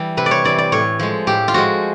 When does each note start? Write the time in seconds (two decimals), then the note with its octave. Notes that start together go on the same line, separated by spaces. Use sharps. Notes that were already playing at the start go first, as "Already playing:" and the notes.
Already playing: E3 G3
0.17 C3 B4
0.26 D5
0.31 C#5
0.44 E3 G3 D5
0.58 D5
0.72 A2 C#5
0.99 F3 G#3
1.27 A2 G4
1.48 F4
1.54 F3 G#3 F#4